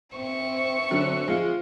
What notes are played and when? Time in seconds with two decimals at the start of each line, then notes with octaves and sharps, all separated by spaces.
0.17 C4 E5 C#6
0.91 D3 F#3
1.28 F3 G#3 F4